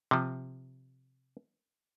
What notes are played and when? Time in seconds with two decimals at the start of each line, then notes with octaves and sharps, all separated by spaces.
0.11 C3 F3